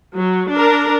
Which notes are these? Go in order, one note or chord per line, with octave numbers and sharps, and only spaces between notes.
F#3
D4 A#4